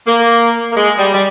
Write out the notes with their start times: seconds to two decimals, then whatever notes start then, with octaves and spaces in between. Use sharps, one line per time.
0.07 A#3
0.72 A#3
0.76 G#3
0.99 G3
1.14 G3